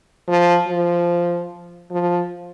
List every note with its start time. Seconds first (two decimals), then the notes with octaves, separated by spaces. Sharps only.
0.28 F3
0.68 F3
1.91 F3